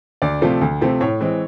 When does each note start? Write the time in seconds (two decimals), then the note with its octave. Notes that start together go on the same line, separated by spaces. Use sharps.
0.22 D2 D5
0.41 C3 F3 A3 C4
0.61 D2
0.81 C3 F3 A3 C4
1.01 A2 C#5
1.20 E3 G#3 C4